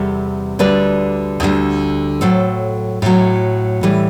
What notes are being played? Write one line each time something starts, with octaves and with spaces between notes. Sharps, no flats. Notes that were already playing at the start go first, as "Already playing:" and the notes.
Already playing: E2 C3 G3 A4
D2 D3 G3 B4 D5
D2 D3 G3
A2 F#3 A4 C5
A2 F#3
A2 E3 G3